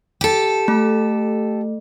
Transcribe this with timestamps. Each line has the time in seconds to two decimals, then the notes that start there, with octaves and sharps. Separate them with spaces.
0.21 G4 A4
0.68 A3